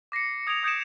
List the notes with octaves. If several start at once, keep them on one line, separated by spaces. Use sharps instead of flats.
D6 A#6 C7 C#7
D#6 G#6 C#7 D7 F7
D#6 G6 G#6 C#7 D7 E7